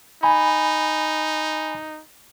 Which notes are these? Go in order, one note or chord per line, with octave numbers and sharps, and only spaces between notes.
D#4 G#5 B5